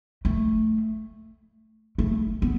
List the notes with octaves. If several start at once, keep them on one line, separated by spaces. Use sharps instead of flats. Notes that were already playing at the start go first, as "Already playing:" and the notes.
A3
A3
B3